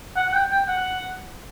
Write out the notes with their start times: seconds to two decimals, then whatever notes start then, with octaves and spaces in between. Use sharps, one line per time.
0.17 F#5
0.27 F#5
0.33 G5
0.51 G5
0.69 F#5